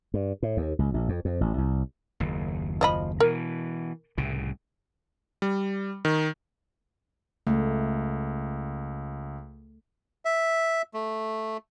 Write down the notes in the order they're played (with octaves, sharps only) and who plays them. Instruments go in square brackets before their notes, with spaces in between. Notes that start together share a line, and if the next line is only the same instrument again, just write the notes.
[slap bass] G2
A2
D#2
C#2
A#1
F2
F2
A1
C2
F#1 D#2
[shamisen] F3 D#5 B5
[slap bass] B2 E3 [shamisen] A#4
[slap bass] C2 A2 C#3
[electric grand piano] G3
D#3
[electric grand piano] C#2 [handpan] A3
[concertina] E5
A3